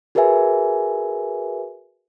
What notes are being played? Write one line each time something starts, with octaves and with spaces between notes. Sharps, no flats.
F#4 G#4 A#4 B4 E5 G#5